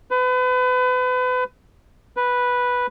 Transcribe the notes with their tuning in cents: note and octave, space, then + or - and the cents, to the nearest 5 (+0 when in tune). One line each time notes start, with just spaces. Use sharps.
B4 +35
B4 -5